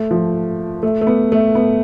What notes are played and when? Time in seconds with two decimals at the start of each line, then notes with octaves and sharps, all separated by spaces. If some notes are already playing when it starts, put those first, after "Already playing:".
Already playing: A3
0.11 F3
0.83 A3
1.01 A3
1.07 B3
1.32 A3
1.55 B3